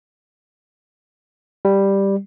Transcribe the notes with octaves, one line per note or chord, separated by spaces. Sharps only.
G3